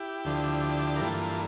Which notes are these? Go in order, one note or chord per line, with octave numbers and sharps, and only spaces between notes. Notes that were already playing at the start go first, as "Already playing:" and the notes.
Already playing: E4 G4
D2 D3 F3
A#4
G2 E3 A#3 F4 A4